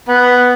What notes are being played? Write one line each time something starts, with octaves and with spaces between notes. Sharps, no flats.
B3